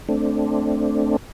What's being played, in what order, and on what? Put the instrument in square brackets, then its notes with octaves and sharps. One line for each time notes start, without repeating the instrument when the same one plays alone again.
[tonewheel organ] A3 C4 D4